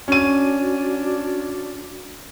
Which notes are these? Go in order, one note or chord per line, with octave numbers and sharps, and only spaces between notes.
C#4 D4 F#4 D#7